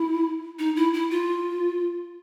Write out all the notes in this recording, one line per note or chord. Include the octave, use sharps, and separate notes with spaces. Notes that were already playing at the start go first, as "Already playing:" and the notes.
Already playing: E4
D#4
E4
E4
F4